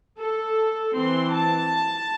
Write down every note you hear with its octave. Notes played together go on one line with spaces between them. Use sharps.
A4
E3 C4 C6
A5